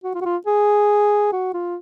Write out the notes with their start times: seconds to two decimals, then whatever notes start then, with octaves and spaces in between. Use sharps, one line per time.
0.04 F#4
0.15 F4
0.21 F#4
0.25 F4
0.47 G#4
1.32 F#4
1.54 F4